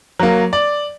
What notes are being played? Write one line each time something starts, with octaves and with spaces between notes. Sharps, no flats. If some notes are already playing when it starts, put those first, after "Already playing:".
F#3 A#3
D5